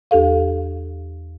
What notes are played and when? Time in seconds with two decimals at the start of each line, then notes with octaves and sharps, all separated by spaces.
0.11 E2 G4 A4 F5